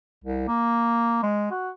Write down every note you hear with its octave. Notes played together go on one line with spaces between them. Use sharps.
C2
A#3
G#3
F#4